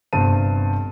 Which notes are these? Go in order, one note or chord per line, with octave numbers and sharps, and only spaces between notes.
G1 G2 C3 C5 A5 D#7